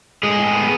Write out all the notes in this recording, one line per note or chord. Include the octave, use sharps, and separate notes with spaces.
A2 G#3 G#4
A2
B3